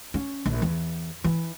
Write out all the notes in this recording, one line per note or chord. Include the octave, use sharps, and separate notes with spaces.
C#4
A#1
E2
E3